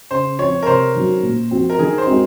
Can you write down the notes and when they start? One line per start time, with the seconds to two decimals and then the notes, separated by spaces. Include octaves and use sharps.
0.11 C#3 C5
0.38 F3 C4 C#5
0.63 A#4
0.66 C3 C5
0.95 D#3 F#3 C#4 F#4
1.23 A#2
1.51 F3 C4 F#4
1.70 A#4
1.79 D#3 G#4
1.98 C5
2.07 G#3 C4 D#4 F#4